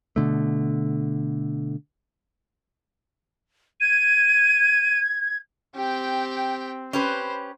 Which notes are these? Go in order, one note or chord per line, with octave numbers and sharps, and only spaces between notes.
B2 D3 A3
G#6 D#7
C4 G4 G5
C#4 G4 B4 C5